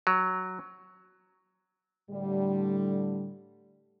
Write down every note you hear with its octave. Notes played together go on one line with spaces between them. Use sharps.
F#3
A2 D3 G3